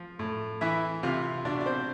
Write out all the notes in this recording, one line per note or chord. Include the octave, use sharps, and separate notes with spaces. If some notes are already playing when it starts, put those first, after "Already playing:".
Already playing: F3
A2
E3 E4 E5
C3 F4 F5
B2 D4 D5
D5
C4 C5